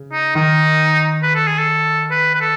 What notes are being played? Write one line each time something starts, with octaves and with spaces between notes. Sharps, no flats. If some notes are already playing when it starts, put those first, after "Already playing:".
Already playing: C#3
D#4
D#3 D#4
B4
A4
G#4
A4
B4
B4
A4